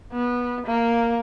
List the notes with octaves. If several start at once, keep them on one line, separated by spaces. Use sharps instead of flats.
B3
A#3